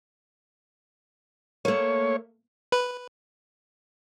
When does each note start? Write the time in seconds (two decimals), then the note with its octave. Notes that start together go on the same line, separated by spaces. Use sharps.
1.65 A3 A#3 C#5
2.72 B4